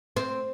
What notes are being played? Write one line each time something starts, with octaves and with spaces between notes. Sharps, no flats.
C4